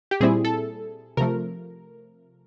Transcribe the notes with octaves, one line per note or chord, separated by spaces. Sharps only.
G4
A#2 G3 C4 E4 G#4
A4
C3 F3 A3 A#4